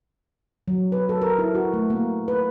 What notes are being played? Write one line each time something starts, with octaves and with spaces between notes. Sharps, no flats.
F#3
B4
A4
A#4
E4
F#4
A3
A#3
B4